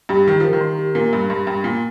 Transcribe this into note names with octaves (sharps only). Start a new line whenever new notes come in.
G2 G4
D#3 A#4
F3 A#4
D#3
C6
G4
A#2 A#4
G2 C6
G2 C6
G2 G5
A#2 C6